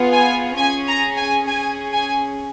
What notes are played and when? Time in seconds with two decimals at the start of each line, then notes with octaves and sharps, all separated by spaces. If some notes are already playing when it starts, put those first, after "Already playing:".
Already playing: B3 F4 G#4
0.12 G#5
0.57 C#4 G#4 G#5
0.88 A#5
1.17 G#5
1.47 C#4 G#4 G#5
1.93 G#5